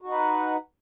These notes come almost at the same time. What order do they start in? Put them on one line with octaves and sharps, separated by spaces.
F#4 D#4 B4 F#5